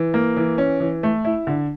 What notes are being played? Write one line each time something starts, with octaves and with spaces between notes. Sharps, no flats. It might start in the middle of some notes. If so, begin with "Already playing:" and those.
Already playing: E3
A#3
E3
C#4
E3
A3
E4
D3